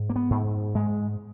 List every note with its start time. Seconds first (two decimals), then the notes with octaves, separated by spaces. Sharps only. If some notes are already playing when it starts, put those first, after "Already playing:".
Already playing: G#2
0.10 A#3
0.16 B3
0.30 G#2
0.75 G#2 G#3